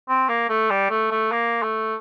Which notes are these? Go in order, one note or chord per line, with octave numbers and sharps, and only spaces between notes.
C4
A#3
A3
G3
A3
A3
A#3
A3